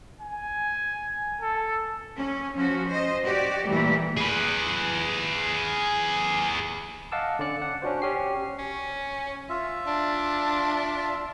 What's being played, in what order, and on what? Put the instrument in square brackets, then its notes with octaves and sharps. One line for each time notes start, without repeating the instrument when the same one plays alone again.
[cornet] G#5
A4
[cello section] C#4
F3 C#4 F#4
C5 D#5
F#4 G4 D5
A#2 E3 G3 A3
[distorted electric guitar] G#4 B4
[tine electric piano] D#5 F5 F#5 A5 D6 E6
D3 C#4 D5 C#7
F#5
C#4 D4 F#4 C5
C#4 G4 C7
[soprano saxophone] C#4
[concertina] F4 E5
[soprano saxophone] D4